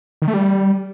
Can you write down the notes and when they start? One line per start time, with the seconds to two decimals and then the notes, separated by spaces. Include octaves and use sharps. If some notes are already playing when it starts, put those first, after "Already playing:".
0.22 D#3
0.28 A3
0.34 G3